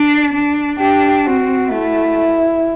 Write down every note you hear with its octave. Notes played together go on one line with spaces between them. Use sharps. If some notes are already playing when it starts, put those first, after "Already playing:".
Already playing: D4
D4
D4 G4
C4 F#4
A3 E4